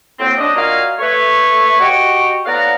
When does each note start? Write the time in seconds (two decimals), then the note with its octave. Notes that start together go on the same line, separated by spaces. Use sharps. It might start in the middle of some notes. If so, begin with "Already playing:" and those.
0.19 A2 F#3 A#3 C4
0.38 D4 D#5
0.55 A#2 F#4 D#5 F5 G#5 A#5
0.99 A3 B4 C#5
1.80 F#4 G4 D#5 G5 C#6
2.46 A2 B3 D5 F5 F#5 A#5